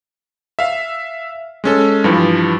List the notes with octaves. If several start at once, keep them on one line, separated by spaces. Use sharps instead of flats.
E5 F5
G#3 C#4 A4
G2 E3 F3 G3